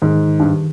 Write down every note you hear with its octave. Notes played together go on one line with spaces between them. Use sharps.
G#2 D#3
G2